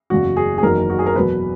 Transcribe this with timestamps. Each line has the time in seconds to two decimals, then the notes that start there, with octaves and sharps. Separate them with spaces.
0.10 F#1 E2 C#3 F#3 F#4
0.37 G#4
0.58 G#4
0.63 F#1 E2 D#3 F#3 A#4
0.90 F#4
0.99 G#4
1.06 A#4
1.16 E2 B2 F#3 B4